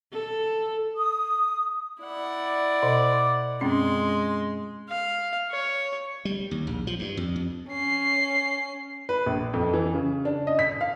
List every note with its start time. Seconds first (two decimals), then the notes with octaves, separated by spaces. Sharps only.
0.12 A4
0.97 D#6
2.02 E4 D5 F#5
2.83 B2 C5 D#5
3.61 F#2 G#3 C4 C#4 C6
4.89 F5
5.51 C#5
6.25 G3
6.51 D#2
6.67 A#1
6.87 F3
6.99 G2
7.17 F2
7.36 F2
7.68 C#4 C7
9.09 B4
9.26 A#1
9.54 F2
9.73 E3
9.94 C#3
10.25 D4
10.47 D#5
10.59 B6
10.81 F5